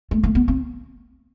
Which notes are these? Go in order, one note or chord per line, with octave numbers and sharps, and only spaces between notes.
A3
A3
B3
C4